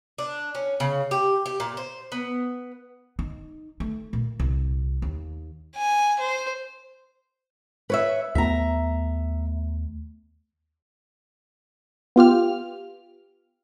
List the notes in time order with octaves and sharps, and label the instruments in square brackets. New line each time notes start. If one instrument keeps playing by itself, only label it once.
[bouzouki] D4
C#4
C#3
G4
G4
A#2
C5
B3
[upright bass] D#4
A3
A#2
C2
D#2
[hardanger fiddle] G#5
C5
[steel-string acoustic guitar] B4 C#5 E5
[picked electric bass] D#2 A3 B3 [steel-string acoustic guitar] E5 A#5
[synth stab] B3 F4 G4 F6